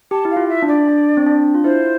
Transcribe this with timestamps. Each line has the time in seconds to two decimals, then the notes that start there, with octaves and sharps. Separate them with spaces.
0.11 G4 A5
0.25 E4
0.31 F5
0.36 F4
0.49 E5
0.62 D4
0.68 D5
0.88 D4
1.17 C4
1.26 D4
1.55 F4
1.64 E4 C5